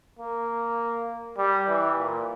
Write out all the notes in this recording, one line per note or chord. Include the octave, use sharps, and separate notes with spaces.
A#3
G3
E3
A#2